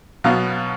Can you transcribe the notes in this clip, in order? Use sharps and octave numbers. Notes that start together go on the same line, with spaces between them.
B2 F#3 B3 F5